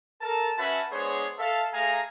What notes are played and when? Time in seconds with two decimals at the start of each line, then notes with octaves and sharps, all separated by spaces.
0.21 A4 A#4 A5
0.58 C#4 F#4 B4 E5 A5 B5
0.92 G#3 B3 D4 G#4 C5 C#5
1.39 A4 E5 F5 A5
1.73 A3 G#4 F5 G#5 A#5